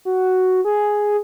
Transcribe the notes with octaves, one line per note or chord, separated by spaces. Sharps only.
F#4
G#4